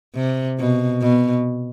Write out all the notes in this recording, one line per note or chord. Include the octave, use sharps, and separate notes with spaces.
C3
B2
B2